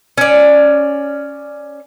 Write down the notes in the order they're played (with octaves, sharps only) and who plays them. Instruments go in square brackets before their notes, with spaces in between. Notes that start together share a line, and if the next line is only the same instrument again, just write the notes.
[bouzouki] C#4 D5